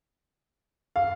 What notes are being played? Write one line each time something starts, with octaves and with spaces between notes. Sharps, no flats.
F5